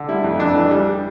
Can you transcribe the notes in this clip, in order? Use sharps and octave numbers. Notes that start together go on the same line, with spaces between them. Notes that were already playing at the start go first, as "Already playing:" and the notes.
Already playing: D3
G3 E4
F2
F2 D4
E3
G3